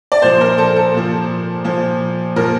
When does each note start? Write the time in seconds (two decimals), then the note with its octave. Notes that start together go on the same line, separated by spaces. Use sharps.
0.12 D5
0.22 A#2 F3 C5
0.41 A#4
0.58 A4
0.76 A4
0.94 A#2 F3
1.64 A#2 F3
2.36 A#2 F3 A#4